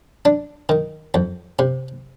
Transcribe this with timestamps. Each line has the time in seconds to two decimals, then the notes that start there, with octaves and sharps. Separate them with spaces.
0.25 D4
0.69 D#3
1.14 F2
1.59 C3